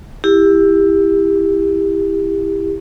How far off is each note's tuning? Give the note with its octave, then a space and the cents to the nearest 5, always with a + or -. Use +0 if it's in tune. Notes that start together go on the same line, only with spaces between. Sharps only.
E4 +0 G4 +25